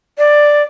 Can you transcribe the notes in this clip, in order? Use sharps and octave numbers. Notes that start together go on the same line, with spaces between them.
D5